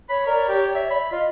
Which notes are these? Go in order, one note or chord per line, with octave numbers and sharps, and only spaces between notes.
C#5 B5
A#4 D5
G4
E5
B5
F4 D#5